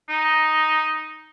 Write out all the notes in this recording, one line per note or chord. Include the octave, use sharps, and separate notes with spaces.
D#4